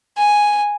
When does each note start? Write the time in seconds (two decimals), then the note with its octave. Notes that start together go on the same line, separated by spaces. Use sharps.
0.17 G#5